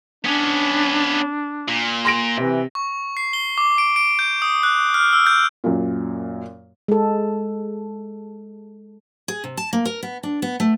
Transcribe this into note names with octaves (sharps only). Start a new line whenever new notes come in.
B3 C#4 D4
A#2
C6 A#6 D7
C3 E3
C#6
C7
G7
D6
D7
D7
G6
D#6
F#6
F6
E6
G6
F#2 A#2
G#3 A4
G#4
C3
A5
A#3
A#4
B3
D4
B3
A3